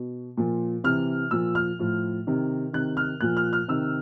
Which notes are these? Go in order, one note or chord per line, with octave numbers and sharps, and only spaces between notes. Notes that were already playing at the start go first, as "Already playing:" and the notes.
Already playing: B2
A#2 F3
C3 E3 F6
A#2 F3 E6
F6
A2 F3
C3 D#3
C3 D#3 F#6
F6
A#2 F3 F#6
F6
F6
C3 D#3 E6